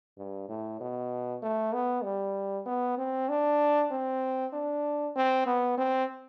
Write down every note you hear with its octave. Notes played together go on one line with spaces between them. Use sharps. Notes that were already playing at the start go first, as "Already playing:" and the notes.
G2
A2
B2
A3
B3
G3
B3
C4
D4
C4
D4
C4
B3
C4